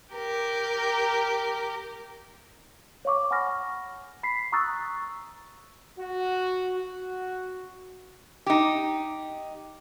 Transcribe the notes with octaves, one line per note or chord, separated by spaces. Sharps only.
G4 A#4
C#5 F5 C#6 D6
F#5 G#5 B5 C#6 F6 A#6
B5 B6 C7
A#5 C#6 D#6 E6 F#6 A6
F#4
F#4
D#4 G4